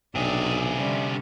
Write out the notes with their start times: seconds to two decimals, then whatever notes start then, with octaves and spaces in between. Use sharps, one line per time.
0.15 B1 C3 D4 G#4
0.77 D3 G3 C#4